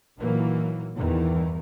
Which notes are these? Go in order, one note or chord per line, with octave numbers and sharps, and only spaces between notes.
A#2 D#3 E3 F#3 A#3
E2 G2 D#3 E3